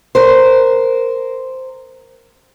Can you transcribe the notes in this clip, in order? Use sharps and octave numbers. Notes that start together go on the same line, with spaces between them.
A#4 C5